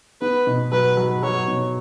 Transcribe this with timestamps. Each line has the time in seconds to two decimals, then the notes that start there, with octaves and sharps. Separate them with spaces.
0.21 B3 B4
0.47 B2
0.72 F#3 B4
0.97 F#3
1.23 F#3 C#5
1.48 B2